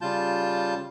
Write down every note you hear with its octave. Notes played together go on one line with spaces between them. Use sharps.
C#3 G3 F4 A5 G6